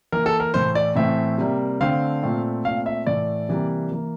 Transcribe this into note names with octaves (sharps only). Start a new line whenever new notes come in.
E3 A#3 A#4
A4
A#4
A2 E3 A3 C5
D5
A2 E3 A3 C4 E5
C3 G3 A#3
D3 A3 C4 F5
A#2 A3 C4
A#2 A3 C4 F5
E5
A2 E3 A3 D5
C3 E3 G3 A#3
E3 A#3